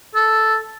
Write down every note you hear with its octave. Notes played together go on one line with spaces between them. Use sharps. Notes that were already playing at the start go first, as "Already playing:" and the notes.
A4